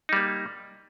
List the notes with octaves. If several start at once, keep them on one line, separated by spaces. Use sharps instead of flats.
G3 A#3 D#4